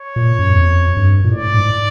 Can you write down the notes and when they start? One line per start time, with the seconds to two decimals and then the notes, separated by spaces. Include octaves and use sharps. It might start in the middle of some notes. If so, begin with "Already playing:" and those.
Already playing: C#5
0.16 A#2
0.39 F#2
0.53 E2
0.62 F2
0.97 G2
1.24 A#2
1.31 A2 D5
1.54 G#2